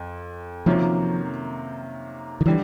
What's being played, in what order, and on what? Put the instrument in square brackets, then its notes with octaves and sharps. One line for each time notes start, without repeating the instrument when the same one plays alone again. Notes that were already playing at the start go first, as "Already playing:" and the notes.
Already playing: [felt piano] F2
[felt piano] C3 D#3 F#3 A#3 C#4 [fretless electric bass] F3
[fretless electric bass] D#3
[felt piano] D3 G3 [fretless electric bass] E3